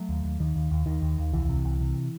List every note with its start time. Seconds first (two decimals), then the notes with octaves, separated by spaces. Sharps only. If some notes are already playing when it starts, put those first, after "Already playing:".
Already playing: F#3 A3
0.09 D#2
0.24 D#2
0.40 D#2 D#3
0.56 D#2
0.71 D#2
0.86 D#2 D#3
1.02 D#2
1.18 D#2
1.33 C2 E3
1.49 C3
1.65 C2
1.81 C3